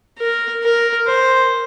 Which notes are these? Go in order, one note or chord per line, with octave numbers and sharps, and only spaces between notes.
A#4
A#4
C5